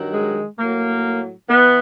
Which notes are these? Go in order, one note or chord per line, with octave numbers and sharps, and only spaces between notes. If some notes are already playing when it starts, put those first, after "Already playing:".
Already playing: G2 D#3 F#3
G#3
A2 F#3 A#3
E3 B3